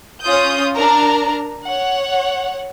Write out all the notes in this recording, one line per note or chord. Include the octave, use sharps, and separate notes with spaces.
C#4 F4 D#6 G6
D4 A#4 A#5
C#5 F#5